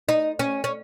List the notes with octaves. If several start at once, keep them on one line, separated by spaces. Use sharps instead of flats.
D#4
C#4
C#4